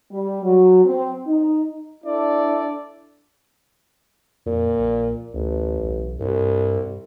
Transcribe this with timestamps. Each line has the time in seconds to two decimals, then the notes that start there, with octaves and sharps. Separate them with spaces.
0.11 G3
0.44 F#3
0.85 C4
1.27 D#4
2.04 D4 E4 A4 D5
4.46 F2 A#2
4.78 A#1
5.34 A1 D2
5.81 B1
6.20 C2 G2